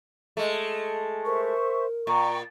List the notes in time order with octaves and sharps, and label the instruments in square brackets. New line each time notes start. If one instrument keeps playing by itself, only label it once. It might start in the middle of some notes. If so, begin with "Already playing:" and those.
[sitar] G#3 A3
[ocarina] A#4 [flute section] C5 E5 C#6
[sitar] A#2 [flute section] G5 A#5 C#6